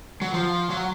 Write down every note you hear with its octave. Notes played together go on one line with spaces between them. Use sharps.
F#3
F3
F#3